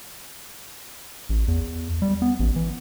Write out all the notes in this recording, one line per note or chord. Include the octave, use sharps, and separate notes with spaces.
A1
E2
G3
B3
A1
E3